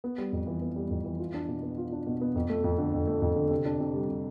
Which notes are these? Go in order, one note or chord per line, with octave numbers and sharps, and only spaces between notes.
B3
G3
F2
E3
B3
G3
F2
E3
F4
D4
B2
B3
F4
D4
B2
B3
F2
A3
F2
D3
F2
A3
F2
D3
C3
D4
C3
G3
C3